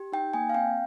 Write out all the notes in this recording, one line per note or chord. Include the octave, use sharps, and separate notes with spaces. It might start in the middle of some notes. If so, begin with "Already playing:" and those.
Already playing: G4
D#4 G5
A#3 G#5
F5
C4 G5